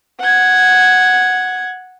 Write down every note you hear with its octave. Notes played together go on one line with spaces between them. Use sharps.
F#5 G#6